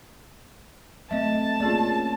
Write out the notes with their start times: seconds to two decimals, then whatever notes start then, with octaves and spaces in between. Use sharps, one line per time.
1.11 F#3 A3 C4 D#5 E5 A5
1.60 A#3 C#4 F4 G#4 D5